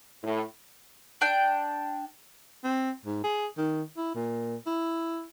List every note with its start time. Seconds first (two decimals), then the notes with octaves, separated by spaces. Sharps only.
0.24 A2
1.21 D4 G5
2.64 C4
3.06 G#2
3.24 G#4
3.58 D#3
3.97 E4
4.15 A#2
4.66 E4